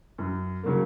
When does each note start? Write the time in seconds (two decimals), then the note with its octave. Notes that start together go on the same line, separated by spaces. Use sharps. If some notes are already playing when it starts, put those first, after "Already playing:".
0.18 F#2
0.63 C#3 F#3 A#3